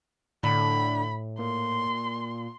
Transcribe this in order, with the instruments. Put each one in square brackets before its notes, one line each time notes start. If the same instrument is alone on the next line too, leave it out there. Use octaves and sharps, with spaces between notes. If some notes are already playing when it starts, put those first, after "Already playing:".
[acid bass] A2 [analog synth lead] D3 [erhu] B5
[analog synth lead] A#2 [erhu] C6